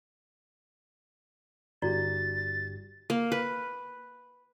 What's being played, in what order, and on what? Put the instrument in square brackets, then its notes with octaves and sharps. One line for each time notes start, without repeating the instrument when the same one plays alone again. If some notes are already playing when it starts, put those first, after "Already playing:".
[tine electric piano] G1 G2 G4 [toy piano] E4 F#4 D5 [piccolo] A6
[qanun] A#3
B4